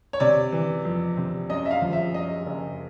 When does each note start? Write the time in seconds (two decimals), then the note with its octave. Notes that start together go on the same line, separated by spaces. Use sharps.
0.13 C#5
0.20 C3 D5
0.52 E3
0.85 F2
1.17 C3
1.49 F#2 D#5
1.66 E5
1.71 F5
1.82 F3
1.93 E5
2.14 F#2 D#5
2.46 F#1